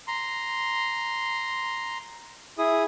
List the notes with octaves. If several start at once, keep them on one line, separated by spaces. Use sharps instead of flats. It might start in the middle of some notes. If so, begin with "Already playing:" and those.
A#5 C6
E4 G#4 D#6